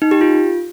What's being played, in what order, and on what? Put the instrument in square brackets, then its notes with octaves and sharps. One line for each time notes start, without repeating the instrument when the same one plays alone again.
[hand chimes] D#4
G4
F4